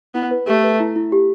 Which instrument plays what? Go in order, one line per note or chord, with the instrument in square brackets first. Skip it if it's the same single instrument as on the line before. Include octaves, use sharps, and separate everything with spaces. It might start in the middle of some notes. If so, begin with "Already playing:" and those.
[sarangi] B3 [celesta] E4
[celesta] B4
[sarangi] A3 [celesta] G4
[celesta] B4
E4
E4
G4